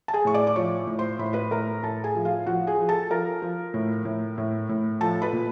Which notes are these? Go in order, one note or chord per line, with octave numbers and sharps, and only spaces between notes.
A5
G#4 G#5
A2 C#6
D5 D6
D6
F3 C#5 C#6
A2
C5 C6
A2 B5
C6
B4 B5
A2 A#4 A#5
A2 A4 A5
G#4 G#5
F3
F4 F5
F3 F#4 F#5
G#4 G#5
F3
A4 A5
F3 A#4 A#5
F3
A2
A2
A2
A2
F3 A4 A5
B4 B5
A#2